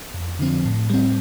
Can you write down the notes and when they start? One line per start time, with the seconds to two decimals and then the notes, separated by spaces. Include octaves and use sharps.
0.14 F2
0.39 D3 F3 C4
0.65 A2
0.90 G3 C4